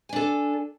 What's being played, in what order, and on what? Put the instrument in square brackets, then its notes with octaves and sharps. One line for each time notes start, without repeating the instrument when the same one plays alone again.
[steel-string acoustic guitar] G#5
D4
A4